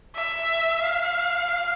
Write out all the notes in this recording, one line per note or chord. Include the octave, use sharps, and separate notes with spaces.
E5
F5